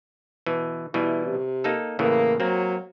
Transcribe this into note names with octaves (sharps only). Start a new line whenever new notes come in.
B2 E3
B2 E3 G3 E4
C3
A#3 D#4 A4
A2 C#3 E3 A#3
F#3 A#3 C4